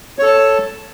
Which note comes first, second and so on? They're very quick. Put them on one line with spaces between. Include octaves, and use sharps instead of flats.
C#5 A4 A5